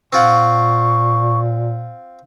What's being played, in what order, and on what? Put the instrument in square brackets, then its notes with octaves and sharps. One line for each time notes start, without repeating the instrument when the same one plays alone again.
[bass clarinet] A#2 [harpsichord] C4 F4 F#5 [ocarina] C#6